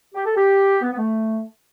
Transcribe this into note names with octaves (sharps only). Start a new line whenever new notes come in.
G4
A4
G4
B3
B3
A3